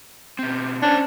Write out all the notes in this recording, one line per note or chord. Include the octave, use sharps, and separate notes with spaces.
B2 C4
C#4 D4 C5 C#5